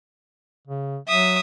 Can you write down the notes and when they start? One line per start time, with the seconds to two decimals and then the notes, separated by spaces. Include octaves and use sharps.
0.68 C#3
1.08 F#3 E5 D#6